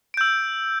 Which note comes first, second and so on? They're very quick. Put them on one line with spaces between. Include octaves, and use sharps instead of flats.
D7 G6 E6